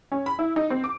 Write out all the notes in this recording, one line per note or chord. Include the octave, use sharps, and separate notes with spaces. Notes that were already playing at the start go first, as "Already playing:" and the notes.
C#4
B5
E4
D#4
C4
D6